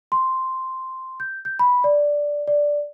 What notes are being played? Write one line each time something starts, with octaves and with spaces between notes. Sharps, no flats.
C6
G6
G6
B5
D5
D5